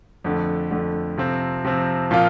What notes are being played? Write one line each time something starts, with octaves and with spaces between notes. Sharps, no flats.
F2 D3 A3
F2 D3 A3
C3 F3 C4
C3 F3 C4
A#2 F3 A#3 F4